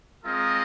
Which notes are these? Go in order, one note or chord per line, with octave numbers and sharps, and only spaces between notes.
G#3 C4 F4 A#4 D#5